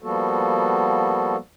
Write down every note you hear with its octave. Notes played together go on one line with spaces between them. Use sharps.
F3 G3 A#3 B3 F#4 A4